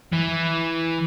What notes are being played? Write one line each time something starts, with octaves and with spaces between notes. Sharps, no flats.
E3